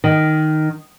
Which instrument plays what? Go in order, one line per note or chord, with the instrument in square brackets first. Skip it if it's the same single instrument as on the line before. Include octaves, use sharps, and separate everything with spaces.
[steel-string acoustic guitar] D#3